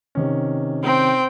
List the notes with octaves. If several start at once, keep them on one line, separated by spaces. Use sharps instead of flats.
C3 D#3 C#4
C4 G5